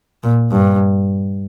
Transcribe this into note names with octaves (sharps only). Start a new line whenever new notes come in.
A#2
G2